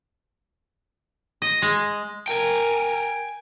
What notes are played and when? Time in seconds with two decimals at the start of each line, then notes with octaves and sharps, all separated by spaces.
1.42 D#5
1.62 G#3
2.28 A#4 G5 G#5